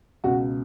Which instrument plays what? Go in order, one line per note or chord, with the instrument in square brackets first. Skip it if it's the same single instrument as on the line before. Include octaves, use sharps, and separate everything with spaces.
[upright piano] C#2 B2 F#4